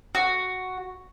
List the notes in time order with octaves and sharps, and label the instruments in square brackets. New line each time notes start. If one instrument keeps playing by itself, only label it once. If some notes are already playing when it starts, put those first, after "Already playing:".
[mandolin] F#4